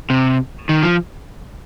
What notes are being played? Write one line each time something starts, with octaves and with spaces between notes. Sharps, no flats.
C3
D#3
F3